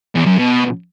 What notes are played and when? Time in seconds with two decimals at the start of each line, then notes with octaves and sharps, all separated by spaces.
0.15 E2
0.26 F#2
0.38 B2